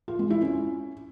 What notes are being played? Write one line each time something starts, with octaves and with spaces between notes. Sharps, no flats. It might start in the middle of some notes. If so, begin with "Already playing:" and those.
F4
G#3
E4
C#4